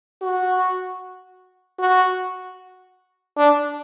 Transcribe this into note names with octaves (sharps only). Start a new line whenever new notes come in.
F#4
F#4
D4